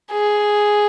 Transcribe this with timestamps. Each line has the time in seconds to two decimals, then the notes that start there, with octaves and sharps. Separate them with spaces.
0.12 G#4